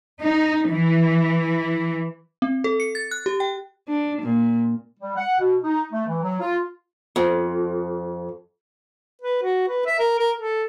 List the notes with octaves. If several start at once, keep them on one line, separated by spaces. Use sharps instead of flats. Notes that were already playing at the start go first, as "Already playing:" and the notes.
D#4
E3
C4
A4
C#7
A6
F#6
G4
G5
D4
A#2
G3
F#5
B2
D#4
A3
E3
F#3
F4
F2
B4
F#4
B4
E5
A#4
A#4
A4